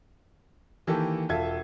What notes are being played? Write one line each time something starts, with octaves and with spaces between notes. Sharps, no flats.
D#3 E3 A#3 G4 A4
E1 F4 A4 E5 G#6